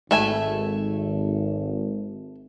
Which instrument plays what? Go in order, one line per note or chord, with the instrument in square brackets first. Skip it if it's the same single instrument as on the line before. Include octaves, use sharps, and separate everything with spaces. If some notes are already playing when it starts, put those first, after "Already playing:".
[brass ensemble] G#1 [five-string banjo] A3 E5 G#5